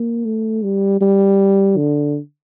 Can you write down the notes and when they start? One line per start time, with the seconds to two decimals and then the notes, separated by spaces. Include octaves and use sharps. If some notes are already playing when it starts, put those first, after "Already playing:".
Already playing: A#3
0.25 A3
0.64 G3
1.01 G3
1.77 D3